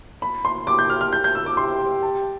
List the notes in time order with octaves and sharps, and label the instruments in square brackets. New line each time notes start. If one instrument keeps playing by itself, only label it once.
[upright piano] B5
C6
[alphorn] G4 [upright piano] D6
[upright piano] G6
F6
F6
G6
G6
E6
D6
[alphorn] G4 [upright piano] C6
[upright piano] A5